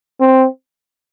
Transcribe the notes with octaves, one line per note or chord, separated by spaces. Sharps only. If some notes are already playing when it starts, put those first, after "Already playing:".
C4